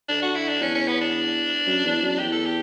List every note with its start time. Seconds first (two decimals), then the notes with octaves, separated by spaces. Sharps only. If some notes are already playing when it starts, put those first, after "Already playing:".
0.09 D3 D4
0.22 F#4
0.35 E4
0.48 D4
0.61 E2 C#4
0.75 C#4
0.88 B3
1.01 D4
1.66 F#2
1.84 E2
2.01 F#2
2.19 E2 G4
2.32 A4
2.46 G4